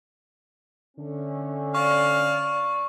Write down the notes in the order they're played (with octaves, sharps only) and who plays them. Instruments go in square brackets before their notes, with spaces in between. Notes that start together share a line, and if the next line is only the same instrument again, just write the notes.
[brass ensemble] D3 A3 C#4
[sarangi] D5 [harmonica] F5 [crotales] C#6